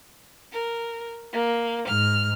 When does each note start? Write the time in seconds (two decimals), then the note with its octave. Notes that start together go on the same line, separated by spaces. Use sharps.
0.52 A#4
1.33 A#3
1.88 G#2 F6